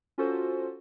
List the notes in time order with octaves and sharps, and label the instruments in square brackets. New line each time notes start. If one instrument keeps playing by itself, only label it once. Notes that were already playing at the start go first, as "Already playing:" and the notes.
[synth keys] C#4 F4 F#4 A4 C5